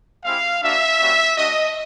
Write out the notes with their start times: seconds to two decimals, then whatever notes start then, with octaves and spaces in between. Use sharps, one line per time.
0.24 G#3 C4 E4 G4 F5
0.62 A#3 D4 F#4 E5
1.00 G3 A#3 C#4 F#4
1.37 A3 D4 F#4 D#5